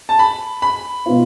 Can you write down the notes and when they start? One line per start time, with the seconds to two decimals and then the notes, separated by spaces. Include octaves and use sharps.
0.09 A5
0.19 B5
0.62 B5
1.06 B2 B3 F4